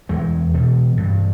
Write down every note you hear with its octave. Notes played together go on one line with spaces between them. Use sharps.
E2 E3 G#3
B2
G2